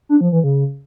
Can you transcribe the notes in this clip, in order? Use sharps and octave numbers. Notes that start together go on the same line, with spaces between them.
D4
F3
E3
C#3